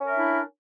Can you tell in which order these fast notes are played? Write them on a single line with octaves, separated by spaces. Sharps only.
C#4 A#4 E5 D4 E4